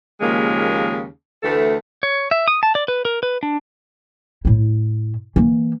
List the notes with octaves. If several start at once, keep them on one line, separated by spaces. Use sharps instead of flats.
D#2 C#3 F3 G#3 A#3
D2 E3 A3 A4
C#5
E5
D#6
A5
D5
B4
A#4
B4
D4
A2 E4
E3 A#3